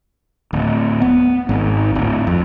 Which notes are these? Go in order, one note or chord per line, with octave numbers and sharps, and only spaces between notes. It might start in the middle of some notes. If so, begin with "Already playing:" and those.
D1
B3
G#1
D1
F2